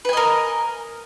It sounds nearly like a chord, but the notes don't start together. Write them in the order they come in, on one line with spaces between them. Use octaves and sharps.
B4 G#5 D#5 A#4